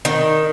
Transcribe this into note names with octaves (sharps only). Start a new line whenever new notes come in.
D#3